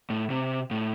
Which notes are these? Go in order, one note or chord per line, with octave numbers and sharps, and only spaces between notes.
A2
C3
A2